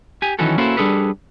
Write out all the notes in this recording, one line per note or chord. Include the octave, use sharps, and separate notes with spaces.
G4 G#5
D#3 E3 F#3 C#4 F#4 A4
A#3 C#4 E4 F#4 A4 C5
G3 D4 G#4 A4 B4